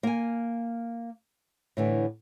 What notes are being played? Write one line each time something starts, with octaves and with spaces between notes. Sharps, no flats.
A#3 G#5
A2 D3 E3